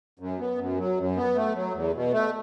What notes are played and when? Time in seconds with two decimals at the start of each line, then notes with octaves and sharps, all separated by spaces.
0.20 F#2
0.39 B3
0.58 F#2
0.78 F#3
0.98 F#2
1.16 B3
1.35 A3
1.55 F#3
1.74 E2
1.94 B2
2.13 A3